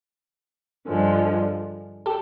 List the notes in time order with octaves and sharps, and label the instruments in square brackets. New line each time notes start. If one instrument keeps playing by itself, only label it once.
[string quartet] G2 D3 F3 G#3
[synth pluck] G4 A4